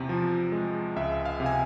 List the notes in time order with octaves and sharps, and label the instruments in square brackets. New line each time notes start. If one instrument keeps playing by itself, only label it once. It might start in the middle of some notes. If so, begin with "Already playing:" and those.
Already playing: [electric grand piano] E2 C3
F3
G#3
C#2 E5
F5
C3
G#5